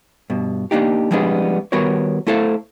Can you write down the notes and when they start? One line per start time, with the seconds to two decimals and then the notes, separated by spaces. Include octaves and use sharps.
0.30 G2 B2
0.71 A#3 D4 D#4 G4
1.11 F3 G3 G#3 B3 C#4 D4
1.72 D#3 G3 B3 F#4 A#4 C#5
2.27 A3 E4 A4 C5 F5